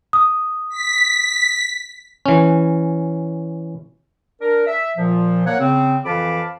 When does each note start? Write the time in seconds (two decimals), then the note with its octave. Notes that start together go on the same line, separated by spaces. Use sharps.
0.13 D#6
0.69 B6
2.26 E3 C#4
4.41 D4 A#4
4.66 E5
4.97 A#2 F3
5.46 A#3 C#5 F#5
5.59 C#3 C4
6.05 F2 E3 F5 A5 B5 D6